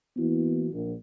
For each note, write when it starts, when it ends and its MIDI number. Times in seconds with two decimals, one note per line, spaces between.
0.17 0.68 52
0.17 0.68 58
0.17 0.68 59
0.17 0.68 64
0.17 0.68 66
0.72 0.93 34